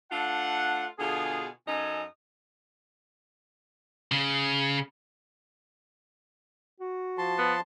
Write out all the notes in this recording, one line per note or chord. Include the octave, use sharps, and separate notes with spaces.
A3 D4 F4 F#5
B2 D3 F4 G#4
F#2 C#4 D#4 A4 G#5
C#3
F#4
F3 A5 C6
B3